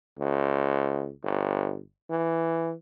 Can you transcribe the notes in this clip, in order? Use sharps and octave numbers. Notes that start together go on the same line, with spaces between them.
C#2
G1
E3